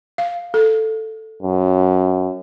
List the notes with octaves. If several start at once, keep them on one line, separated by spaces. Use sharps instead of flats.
F5
A4
F#2